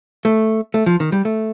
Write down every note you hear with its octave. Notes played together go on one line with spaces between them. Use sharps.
A3
A3
F3
D#3
G3
A3